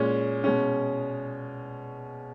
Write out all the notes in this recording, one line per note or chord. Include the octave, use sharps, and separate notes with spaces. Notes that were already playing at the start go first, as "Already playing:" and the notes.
Already playing: A#2 G#3 C#4
B2 G#3 C#4